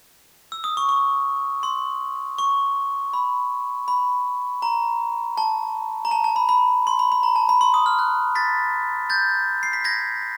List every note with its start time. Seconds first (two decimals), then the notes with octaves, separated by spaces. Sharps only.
0.52 E6
0.64 D#6
0.77 C#6
0.89 C#6
1.63 C6
2.38 C#6
3.13 B5
3.88 B5
4.62 A#5
5.38 A5
6.05 A#5
6.11 A5
6.24 A5
6.36 B5
6.49 B5
6.87 C6
6.99 B5
7.12 B5
7.23 A#5
7.36 A5
7.49 B5
7.61 C6
7.74 D#6
7.86 F6
7.99 F#6
8.35 A6 B6
9.10 G6 A6
9.63 C7
9.73 B6
9.84 G#6 A#6